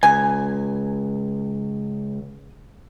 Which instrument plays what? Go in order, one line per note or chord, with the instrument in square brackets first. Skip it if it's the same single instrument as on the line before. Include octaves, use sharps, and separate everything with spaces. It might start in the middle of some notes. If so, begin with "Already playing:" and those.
[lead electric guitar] C#2 [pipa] G#5